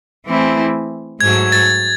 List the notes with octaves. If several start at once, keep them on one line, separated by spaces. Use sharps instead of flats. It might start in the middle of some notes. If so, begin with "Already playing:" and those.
E3 A3 C4 E4 G#4
G#2 F#3 A3 G#6
A6